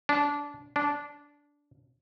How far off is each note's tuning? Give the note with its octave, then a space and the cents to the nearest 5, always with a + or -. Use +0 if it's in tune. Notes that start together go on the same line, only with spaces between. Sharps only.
D4 -20
D4 -15